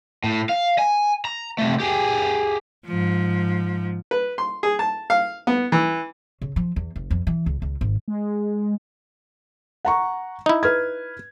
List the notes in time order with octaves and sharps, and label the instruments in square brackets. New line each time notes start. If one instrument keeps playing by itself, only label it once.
[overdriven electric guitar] A2
F5
G#5
A#5
C3 A3
G4 G#4
[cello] G#2 F3
[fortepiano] B4
C6
G#4
A5
F5
B3
E3
[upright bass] C#3
F3
E2
F#1
F2
E3
C#2
C#2
G#1
[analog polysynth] G#3
[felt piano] F#5 A#5 C#6
[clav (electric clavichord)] D#4 E4
[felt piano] B4 F6 G#6